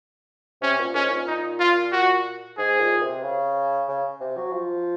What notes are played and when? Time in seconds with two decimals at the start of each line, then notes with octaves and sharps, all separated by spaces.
0.61 C3 C#4
0.79 A#2
0.95 G#2 C#4
1.11 A#2
1.27 D#4
1.60 F4
1.92 F#4
2.58 G#2 G#4
2.80 A#2
3.01 C3
3.23 C#3
3.88 C#3
4.20 C3
4.37 F#3
4.52 F3